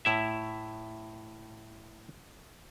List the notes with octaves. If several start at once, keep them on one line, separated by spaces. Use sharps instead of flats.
A2 E4 E5